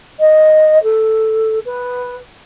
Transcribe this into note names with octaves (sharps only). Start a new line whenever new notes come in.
D#5
A4
B4